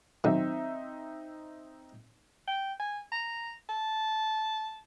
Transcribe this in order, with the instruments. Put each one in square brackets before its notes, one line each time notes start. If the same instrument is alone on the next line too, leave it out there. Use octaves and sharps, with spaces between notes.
[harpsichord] B1 D#3 [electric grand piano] C4 D#4 E5
[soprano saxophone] G5
G#5
A#5
A5